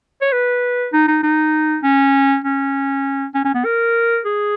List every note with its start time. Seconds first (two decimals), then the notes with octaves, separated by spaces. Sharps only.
0.22 C#5
0.32 B4
0.93 D#4
1.08 D#4
1.23 D#4
1.83 C#4
2.44 C#4
3.34 C#4
3.45 C#4
3.55 B3
3.65 A#4
4.25 G#4